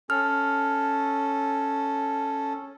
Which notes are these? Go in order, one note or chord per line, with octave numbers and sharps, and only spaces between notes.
C#4 A4 F6